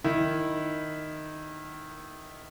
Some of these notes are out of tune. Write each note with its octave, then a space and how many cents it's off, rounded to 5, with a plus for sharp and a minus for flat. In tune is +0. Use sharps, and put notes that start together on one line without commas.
D#3 -10 E4 -5